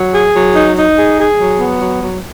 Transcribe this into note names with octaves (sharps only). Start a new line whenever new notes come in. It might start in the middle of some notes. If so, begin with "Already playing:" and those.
Already playing: F#3
G#4
F#3
D#4
D#4
G#4
G#4
F#3
B3
F#3
F#3